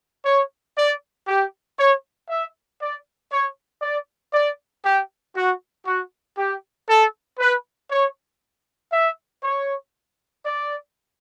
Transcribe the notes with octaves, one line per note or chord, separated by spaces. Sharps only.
C#5
D5
G4
C#5
E5
D5
C#5
D5
D5
G4
F#4
F#4
G4
A4
B4
C#5
E5
C#5
D5